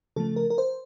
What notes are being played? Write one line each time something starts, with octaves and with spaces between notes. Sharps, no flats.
C#3 F3 A3 A4
A#4
A#4
C5